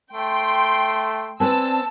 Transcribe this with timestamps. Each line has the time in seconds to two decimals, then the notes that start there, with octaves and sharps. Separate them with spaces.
0.13 A3 G5 C6
1.40 C4 B4 D5 G#5 A5 E6